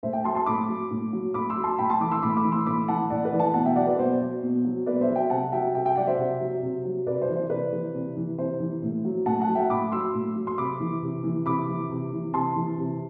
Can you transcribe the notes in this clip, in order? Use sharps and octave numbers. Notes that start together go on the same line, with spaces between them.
A2 C5 E5
E5 G5
F#3 A5 C6
A5 C6
A2 B5 D6
F#3
A2
F#3
A2 B5 D6
C6 E6
F#3
A5 C6
A2 G5 B5
A5 C6
E3 B5 D6
C6 E6
A2 B5 D6
B5 D6
E3
C6 E6
A2 B5 D6
E3 F#5 A5
A2 D5 F#5
B4 D5
E3
F#5 A5
B2 F#5 A5
E5 G5
F#3 D5 F#5
B4 D5
B2 C5
F#3
B2
F#3
B2 B4 D5
C5 E5
F#3
E5 G5
C3 F#5 A5
F#3 E5 G5
C3 E5 G5
E5 G5
F#3 D5 F#5
C5 E5
C3
F#3
C3
F#3
C3 B4 D5
C5
E3
C5
C3 B4 D5
E3
C3
E3
C3 C5
E3
A2
F#3
A2 F#5 A5
F#5 A5
F#3
E5 G5
A2 B5 D6
F#3 C6 E6
A2
F#3
C6
C3 B5 D6
E3
C3
E3
C3 B5 D6
E3
C3
E3
C3 A5 C6
E3
C3